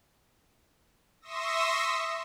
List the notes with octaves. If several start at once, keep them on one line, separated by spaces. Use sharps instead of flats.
E5 C6 C#6 D#6 E6 A#6